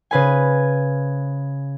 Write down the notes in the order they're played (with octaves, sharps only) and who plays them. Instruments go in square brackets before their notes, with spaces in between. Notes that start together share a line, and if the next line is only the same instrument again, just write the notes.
[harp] C#3 B4 G#5